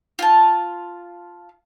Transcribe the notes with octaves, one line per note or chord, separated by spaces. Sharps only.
F4 A5